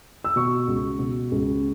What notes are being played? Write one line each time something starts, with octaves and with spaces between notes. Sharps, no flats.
E6
B2 C#6
C#2
B2
C#2